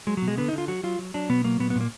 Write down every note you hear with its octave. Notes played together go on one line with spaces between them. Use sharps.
F#3 G#3
F#3
B2
G#3
D3 B3
D#4
D3
F4
F#3 F#4
F#3 F4
F#3
F#3 D4
B2 B3
F#3 A#3
A#2 B3
B3
A#2 A#3